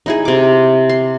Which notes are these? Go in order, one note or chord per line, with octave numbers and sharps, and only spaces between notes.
D#4 E4 G#4
C3 D6
C6